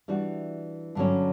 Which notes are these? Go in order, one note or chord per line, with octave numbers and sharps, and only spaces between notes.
E3 G3 D4 F#4
G2 D3 F#3 C#4